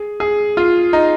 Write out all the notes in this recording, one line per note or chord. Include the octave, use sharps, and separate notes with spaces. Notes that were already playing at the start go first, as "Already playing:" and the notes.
Already playing: G#4
G#4
F4
D#4